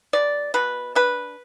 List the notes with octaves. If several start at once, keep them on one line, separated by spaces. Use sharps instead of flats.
B2 D5
B2 B4
D4 B4